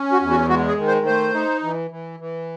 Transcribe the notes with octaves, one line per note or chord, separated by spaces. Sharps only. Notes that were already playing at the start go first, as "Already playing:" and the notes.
Already playing: C#4
F#4
E2
F#4
G#3 F#4
G#4
D#3
C5
A3 C5
D#4
E3
E3
E3